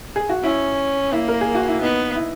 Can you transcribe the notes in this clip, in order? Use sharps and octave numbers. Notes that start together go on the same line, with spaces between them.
G#4
F#4
C#4 E4
A#3 E4
A#4
G#4
F#4
E4
B3 D#4
E4